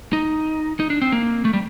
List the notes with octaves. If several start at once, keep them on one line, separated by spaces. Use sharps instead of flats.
D#4
D#4
D4
C4
A#3
A3
G3